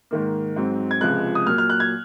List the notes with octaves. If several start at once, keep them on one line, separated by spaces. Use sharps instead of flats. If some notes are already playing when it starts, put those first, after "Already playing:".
G#2 D#3 A#3
G#2 F#3 C4
G#6
C#2 C3 F3 G#3 F#6
D#6
A#2 F#3 A#3 F6
F6
F#6
G#6